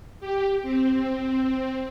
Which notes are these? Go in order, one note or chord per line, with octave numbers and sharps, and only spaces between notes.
G4
C4